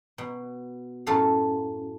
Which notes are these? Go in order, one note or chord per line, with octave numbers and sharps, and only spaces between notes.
B2
F#2 A2 A3 A4 F5